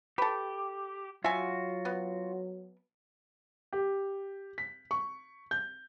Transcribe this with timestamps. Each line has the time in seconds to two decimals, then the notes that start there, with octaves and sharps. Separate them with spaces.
0.18 G4 A4 B4
1.24 F#3 F4 F#4 E5 G#5
1.85 B3
3.73 G4
4.58 B6
4.91 C#6
5.51 G6